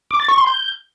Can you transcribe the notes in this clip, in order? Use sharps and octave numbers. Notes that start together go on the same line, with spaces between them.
D6
A6
C#6
C6
G6